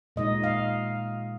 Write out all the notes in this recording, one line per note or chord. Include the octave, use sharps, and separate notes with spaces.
A#2 G#3 D#4 D#5
F5